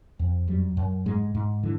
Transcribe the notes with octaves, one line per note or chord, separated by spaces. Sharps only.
F2
F#2 G3
F#2
G#2 G#3
G#2
D3 E3